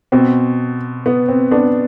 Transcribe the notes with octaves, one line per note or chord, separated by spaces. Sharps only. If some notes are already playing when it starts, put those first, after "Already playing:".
B2 C4
B3
C4
B3 D4